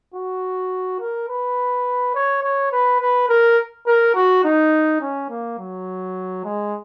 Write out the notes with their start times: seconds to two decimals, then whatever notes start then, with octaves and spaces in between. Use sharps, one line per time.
0.14 F#4
1.00 A#4
1.29 B4
2.15 C#5
2.43 C#5
2.72 B4
3.01 B4
3.29 A#4
3.87 A#4
4.15 F#4
4.44 D#4
5.01 C#4
5.30 A#3
5.59 F#3
6.45 G#3